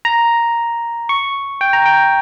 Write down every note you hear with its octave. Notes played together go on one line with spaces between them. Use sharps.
A#5
C#6
G5
A#5
G5